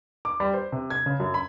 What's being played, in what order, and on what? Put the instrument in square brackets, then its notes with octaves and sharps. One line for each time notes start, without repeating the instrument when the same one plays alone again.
[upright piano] D6
G3
C5
C3
G#6
C#3
F#2
B5